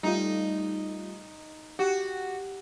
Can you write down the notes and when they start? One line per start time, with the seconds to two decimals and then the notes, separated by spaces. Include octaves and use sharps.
0.03 G3 A3 D#4 F4
1.79 F#4 G4